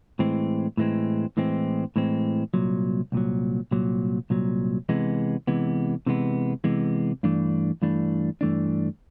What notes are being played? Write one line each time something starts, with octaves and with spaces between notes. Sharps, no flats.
A2 E3 G#3 C4
A2 E3 G#3 C4
A2 E3 G#3 C4
A2 E3 G#3 C4
C2 A#2 F#3
C2 A#2 F#3
C2 A#2 F#3
C2 A#2 F#3
C3 E3 G#3 B3
C3 E3 G#3 B3
C3 E3 G#3 B3
C3 E3 G#3 B3
G2 E3 A3 D4
G2 E3 A3 D4
G2 E3 A3 D4